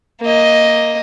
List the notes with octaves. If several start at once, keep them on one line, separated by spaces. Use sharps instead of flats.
A#3 D#5